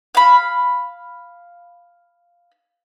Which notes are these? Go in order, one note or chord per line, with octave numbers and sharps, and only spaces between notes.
F5 B5